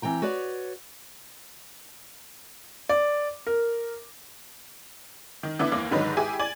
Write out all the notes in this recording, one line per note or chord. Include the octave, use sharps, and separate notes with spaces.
E3 C4 G5 A#5
F#4 B4 C#5 D5
D5
A#4
D#3
D3 E3 B3 D4 E4
D#2 E3 A#3
G#2 D3 D#3 F#3 D#4 B4
E4 G4 G#4 G#5
D5 G#5 G#6